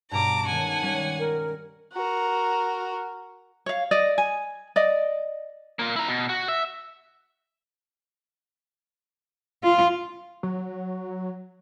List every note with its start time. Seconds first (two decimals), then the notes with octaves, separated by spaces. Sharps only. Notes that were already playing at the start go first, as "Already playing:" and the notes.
0.11 G2 B2 A5 A#5 D6
0.46 D#3 G#3 C#4 F#5 G#5
0.82 G3 C#4
1.19 A#4
1.92 F#4 A#4
3.66 C#5 F5
3.91 D5 D#5
4.18 G#5
4.76 D5 D#5
5.79 A#3 F4
5.96 E4 A#5
6.08 B2
6.29 F#4
6.48 E5
9.63 F4
10.43 F#3